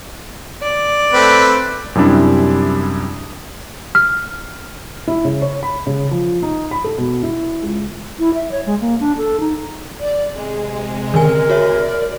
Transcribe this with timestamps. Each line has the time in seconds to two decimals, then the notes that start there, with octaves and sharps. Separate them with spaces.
0.61 D5
1.13 A3 C4 B4
1.95 F#2 C3 G3 D4 E4
3.95 F6
5.08 E4
5.25 C#3
5.42 C#5
5.63 B5
5.87 C#3
6.11 F3
6.43 D#4
6.71 B5
6.84 A4
6.98 B2
7.23 E4
7.62 C#2
8.19 E4
8.34 E5
8.52 C#5
8.66 G#3
8.81 A#3
9.00 D4
9.17 A4
9.40 D#4
10.00 D5
10.35 C3 G#3
11.14 D3 D#3 A#4 G#5
11.50 F#4 C#5 E5
11.79 D5